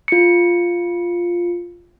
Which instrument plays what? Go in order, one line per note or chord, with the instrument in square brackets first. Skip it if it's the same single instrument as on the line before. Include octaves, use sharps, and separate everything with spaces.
[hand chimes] F4 C#7